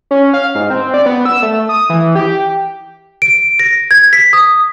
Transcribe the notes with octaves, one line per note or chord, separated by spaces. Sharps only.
C#4
F5
G#2
C4
D5
B3
E6
A3
D#6
E3
G4
D7
A#6
G#6
B6
D#6